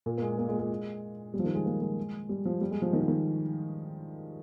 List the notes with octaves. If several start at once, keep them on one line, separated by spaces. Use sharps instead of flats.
A#2
A#3
G#3
A#3
G#3
G#3
G3
F3
D#3
G#3
A#3
G#3
G3
F3
G3
G#3
F3
D#3
F3
D#3